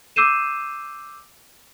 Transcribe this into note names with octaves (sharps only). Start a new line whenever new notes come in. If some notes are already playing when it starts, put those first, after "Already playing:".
D6 E6 G6 C7 D#7 E7